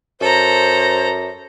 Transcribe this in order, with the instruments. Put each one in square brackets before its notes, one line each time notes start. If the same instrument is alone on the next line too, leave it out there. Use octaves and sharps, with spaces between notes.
[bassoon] F#2 [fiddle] A4 A#5 [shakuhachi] C5